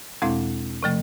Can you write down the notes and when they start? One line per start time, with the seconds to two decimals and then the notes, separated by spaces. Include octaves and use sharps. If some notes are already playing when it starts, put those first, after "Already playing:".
0.22 E2 B2 G#3 C4 E4
0.83 C3 F3 A3